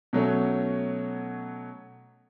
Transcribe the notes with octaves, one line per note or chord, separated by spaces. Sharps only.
B2 F#3 A3 C#4